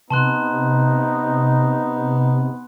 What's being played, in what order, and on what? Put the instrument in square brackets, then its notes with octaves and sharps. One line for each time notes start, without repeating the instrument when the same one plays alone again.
[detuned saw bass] C3 [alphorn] B3 [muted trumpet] D#4 [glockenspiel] A5 C6 F#6